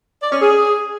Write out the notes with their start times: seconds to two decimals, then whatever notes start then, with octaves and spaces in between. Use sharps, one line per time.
0.22 D5
0.32 C#4
0.42 G#4